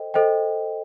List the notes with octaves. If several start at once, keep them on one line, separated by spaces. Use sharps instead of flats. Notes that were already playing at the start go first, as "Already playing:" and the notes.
Already playing: A4 C5 D#5 G5
A4 C5 D#5 G5